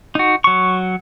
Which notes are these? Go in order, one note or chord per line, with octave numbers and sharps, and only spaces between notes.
D#4 F#4
F#3 C#6